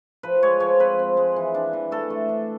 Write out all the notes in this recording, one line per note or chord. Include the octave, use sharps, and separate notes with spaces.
F3 B4
G#3 C#5
F3 C#5
C4 B4
C4
G#3
E3
D4
E3
A3 A4
A3
D4